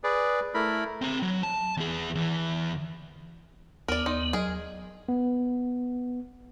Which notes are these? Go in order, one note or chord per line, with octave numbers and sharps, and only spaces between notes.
G#4 B4 D5
A3 E4 A#4 B5
C4 A#5
F#3
A5
E2 G#4
E2 E3
D#2 B3 A#4 D5
D#4 D5 C6
F#3 G#4 A#4 D#5
B3